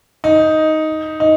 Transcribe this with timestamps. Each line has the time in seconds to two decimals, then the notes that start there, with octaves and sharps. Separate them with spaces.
0.24 D#4
1.20 D#4